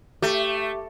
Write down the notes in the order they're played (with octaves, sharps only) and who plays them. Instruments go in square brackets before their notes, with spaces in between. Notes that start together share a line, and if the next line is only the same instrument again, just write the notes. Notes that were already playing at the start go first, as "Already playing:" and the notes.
[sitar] A3 [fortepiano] G4